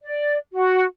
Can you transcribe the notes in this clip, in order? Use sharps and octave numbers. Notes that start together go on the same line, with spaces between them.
D5
F#4